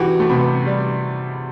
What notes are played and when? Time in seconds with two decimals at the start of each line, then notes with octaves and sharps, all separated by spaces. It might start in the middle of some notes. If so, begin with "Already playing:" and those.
Already playing: E3 F#4 G4
0.20 A3
0.30 C3 B3
0.66 G3